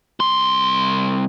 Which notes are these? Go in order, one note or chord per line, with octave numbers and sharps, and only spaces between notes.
C2 C6